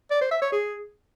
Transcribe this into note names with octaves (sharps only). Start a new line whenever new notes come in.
D5
C5
E5
C#5
G#4